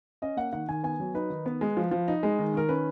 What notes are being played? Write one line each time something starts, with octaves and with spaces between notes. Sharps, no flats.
C#4 D#5
A#3 F#5
D#3 F#5
D#3 G#5
B3 G#5
F#3
D#4 B4
D#3
B3
G#3
F3
F3
D#4
G#3
D#3
D#3 A#4
C#4 B4